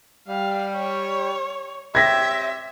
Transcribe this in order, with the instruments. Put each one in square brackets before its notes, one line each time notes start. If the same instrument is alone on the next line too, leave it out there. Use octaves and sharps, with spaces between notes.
[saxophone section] G3 [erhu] F5
[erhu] C#5
[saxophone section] C4 G4 C#5 [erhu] E5 [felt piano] G#6 A#6 B6